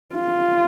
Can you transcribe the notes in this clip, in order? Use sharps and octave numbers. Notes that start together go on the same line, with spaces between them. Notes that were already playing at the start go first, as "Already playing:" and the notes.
F4